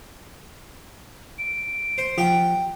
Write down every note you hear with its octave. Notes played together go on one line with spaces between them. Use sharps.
D7
C5
F3 G4 F#5 G5